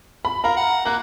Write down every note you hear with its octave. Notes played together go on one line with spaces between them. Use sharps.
B5
A#4 F5 A#5
F#5
A#3 F#6